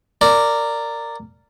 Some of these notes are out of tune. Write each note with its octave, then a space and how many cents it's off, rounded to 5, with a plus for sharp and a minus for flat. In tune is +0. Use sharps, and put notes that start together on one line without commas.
A#4 -15 D5 +0